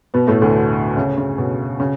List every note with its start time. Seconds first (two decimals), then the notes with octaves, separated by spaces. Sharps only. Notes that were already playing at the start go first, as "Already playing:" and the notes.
0.14 B2 B3
0.27 A2 A3
0.42 D2 D3
0.97 C#3
1.17 C#3
1.38 B2
1.80 C#3